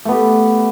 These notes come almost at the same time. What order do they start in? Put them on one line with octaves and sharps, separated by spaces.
A3 B3 G4